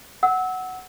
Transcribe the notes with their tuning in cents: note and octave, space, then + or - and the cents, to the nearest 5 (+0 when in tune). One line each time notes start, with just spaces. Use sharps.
F#5 +5 E6 -25